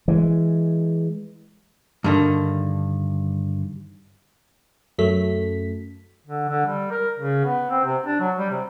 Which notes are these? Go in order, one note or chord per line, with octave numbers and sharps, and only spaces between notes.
E3 G#3
G2 D3 D#3
F#2 A3 B6
D3
D3
G3
A#4
C#3
B3
C4
C3
D4
F#3
G3
C3